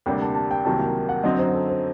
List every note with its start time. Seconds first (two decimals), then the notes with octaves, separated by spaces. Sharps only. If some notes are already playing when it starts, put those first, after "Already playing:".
0.06 D2 C3 G3 A#3 D4 G5
0.21 A5
0.35 A5
0.51 G5
0.65 C2 C3 D#3 F#3 A#3 A5
0.79 G5
1.09 F#5
1.24 F#2 D3 F#3 C4 D#4 D#5
1.39 C5
1.54 A4
1.69 C5